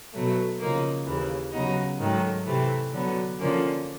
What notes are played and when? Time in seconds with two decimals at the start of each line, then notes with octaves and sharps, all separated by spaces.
0.13 B2 F#3 A3
0.60 C#3 F3 A#3 D#4
1.07 D#2 C#3 E3
1.53 C#3 F#3 B3 D#4 F#4
1.99 G#2 D#3 F#3 A3
2.46 C3 E3 A3 C4
2.93 D3 F#3 B3
3.39 D3 F3 A#3 C#4